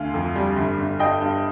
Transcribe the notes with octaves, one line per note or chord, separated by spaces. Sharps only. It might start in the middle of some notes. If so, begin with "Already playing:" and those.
Already playing: D2 F5 G#5
F2
G3
G1
G1
G2 D#5 G5
G2